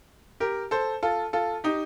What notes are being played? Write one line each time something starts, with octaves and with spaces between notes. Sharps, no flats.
G4 A#4
A4 C5
F4 A4
F4 A4
D#4 G4